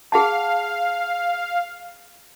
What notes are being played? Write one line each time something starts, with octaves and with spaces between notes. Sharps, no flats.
G#4 F5 F#5 A5